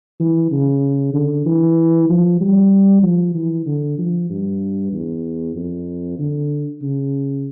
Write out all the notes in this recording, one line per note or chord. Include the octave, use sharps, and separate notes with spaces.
E3
C#3
D3
E3
F3
G3
F3
E3
D3
F3
G2
E2
F2
D3
C#3